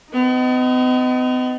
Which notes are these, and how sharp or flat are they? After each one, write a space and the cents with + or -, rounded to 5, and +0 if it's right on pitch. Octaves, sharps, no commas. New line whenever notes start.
B3 +45 D#4 +0